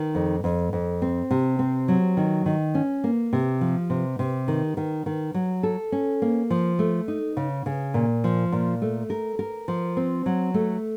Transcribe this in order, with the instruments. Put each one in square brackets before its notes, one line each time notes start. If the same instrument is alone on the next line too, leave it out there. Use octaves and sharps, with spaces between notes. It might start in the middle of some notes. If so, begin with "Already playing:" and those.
Already playing: [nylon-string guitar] D#3
F2
F2
F2
C4
C3
C4
F#3
D#3
D#3
C#4
A#3
C3
F3
C3
C3
D#3
D#3
D#3
F#3
A4
C#4
A#3
F3
A3
D#4
C#3
C#3
A#2
F3
A#2
A3
A#4
A#4
F3
C4
F#3
A3